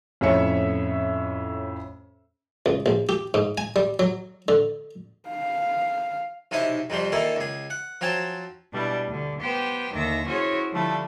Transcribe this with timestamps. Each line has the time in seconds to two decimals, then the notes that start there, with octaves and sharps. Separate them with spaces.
0.21 F2 A2 A3 C#4 E5 C#7
2.66 C#2
2.86 A#1
3.09 G4
3.34 G#2
3.58 G#5
3.76 G3
3.99 F#3
4.48 D3
5.30 F5
6.51 B1 C3 D#4 E4 D#6
6.90 F2 C3 G3 C5
7.12 A#2 D#3 A#3 E4 A4
7.36 C#2 G#4
7.70 F#5
8.01 F3 F#3 C4 G#5 A5
8.72 B2 G3 D4 E4
9.07 D2 D3
9.40 B3 G4 C5 G5
9.93 D#2 D3 D#3 E5 A#6
10.27 C#4 E4 F#4 G#4 C5 C#5
10.71 D3 F3 G3 A3 E4